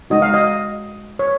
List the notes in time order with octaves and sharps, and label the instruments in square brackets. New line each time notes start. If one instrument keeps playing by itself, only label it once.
[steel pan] G#3 D#4 F#4 D#5
F5
D#5
C#5